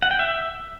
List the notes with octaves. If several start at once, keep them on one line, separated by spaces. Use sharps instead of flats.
F#5
G5
E5